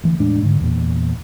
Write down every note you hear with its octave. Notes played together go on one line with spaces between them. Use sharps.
D2 E3
E2 A2 G#3 D4
G#2 D3
E2 A#2